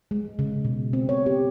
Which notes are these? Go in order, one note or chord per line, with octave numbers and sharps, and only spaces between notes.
G#3
C#3
B2
C4
C#5
G4